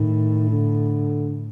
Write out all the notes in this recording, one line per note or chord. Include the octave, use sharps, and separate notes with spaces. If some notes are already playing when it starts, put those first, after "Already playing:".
Already playing: A2 D#3
D3